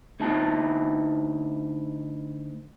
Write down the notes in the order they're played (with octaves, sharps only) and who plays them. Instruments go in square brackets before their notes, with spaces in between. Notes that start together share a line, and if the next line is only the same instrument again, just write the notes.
[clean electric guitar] D2 D#4 E4 E5 A5